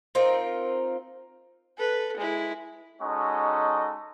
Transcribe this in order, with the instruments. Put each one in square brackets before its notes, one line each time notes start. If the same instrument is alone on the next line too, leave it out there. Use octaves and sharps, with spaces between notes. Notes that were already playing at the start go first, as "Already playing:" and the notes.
[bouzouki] C4 D#4 F4 A#4
[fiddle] A4 B4
G#3 E4
[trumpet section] G#3 C#4 D#4 F#4 A4 D#5